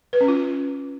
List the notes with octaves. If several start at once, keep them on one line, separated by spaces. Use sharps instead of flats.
B4
C#4
F4